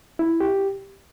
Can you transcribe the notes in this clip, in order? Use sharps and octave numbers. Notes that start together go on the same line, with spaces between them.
E4
G4